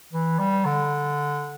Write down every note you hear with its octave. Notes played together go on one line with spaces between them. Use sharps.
E3
G3
D3